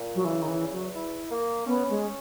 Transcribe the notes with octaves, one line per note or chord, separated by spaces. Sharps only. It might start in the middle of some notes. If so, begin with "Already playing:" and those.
Already playing: A#2
F#3
C#3 E3
D#3
E3
E2
F#3
E4
A#3
B3 C#4
G#3
C#4